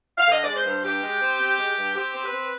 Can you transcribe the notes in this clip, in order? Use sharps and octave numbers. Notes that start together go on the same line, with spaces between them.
F5
D3 D#5
G#3 D5
C5
G2
G2 G4
G#3
C4
C4
G#3
G2
C4 G4
C4
B4
C4